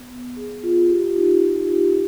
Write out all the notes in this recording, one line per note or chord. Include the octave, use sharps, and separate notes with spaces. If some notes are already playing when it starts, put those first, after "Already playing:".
Already playing: B3
B3
G#4
F4
G4
D#4
G4
G4